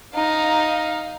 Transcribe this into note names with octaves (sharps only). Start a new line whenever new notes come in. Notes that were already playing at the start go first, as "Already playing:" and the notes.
D#4 F5